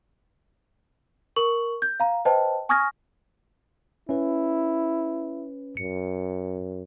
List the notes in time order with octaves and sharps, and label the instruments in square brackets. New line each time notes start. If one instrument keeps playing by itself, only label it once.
[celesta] A#4 C#6 F#7
G6 G#6
F5 A#5
B4 C5 D#5 G5 A5
G#5 C#6 D#6 F6 G#6 A#6
[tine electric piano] C#4 B4 [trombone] E4
[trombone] F#2 [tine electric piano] C#7